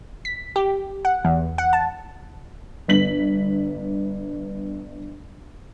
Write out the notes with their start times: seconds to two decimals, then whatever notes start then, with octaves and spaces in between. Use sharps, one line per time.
0.25 B6
0.56 G4
1.05 F#5
1.25 E2
1.58 F#5
1.73 A5
2.88 G1 B3 B6 F#7